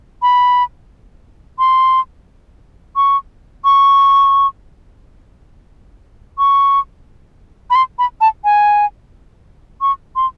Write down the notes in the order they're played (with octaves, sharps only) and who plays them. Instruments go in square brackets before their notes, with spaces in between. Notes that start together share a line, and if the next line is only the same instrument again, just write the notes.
[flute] B5
C6
C#6
C#6
C#6
B5
C6
B5
A5
G#5
C#6
C6